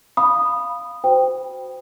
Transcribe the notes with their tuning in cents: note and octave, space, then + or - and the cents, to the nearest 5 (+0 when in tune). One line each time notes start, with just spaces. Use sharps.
F5 +0 B5 -5 D#6 -10
F#4 +0 C5 -20 G5 +5